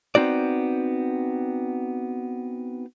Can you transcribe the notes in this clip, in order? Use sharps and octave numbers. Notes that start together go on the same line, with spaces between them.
B3 C4 D#4 F#4 D5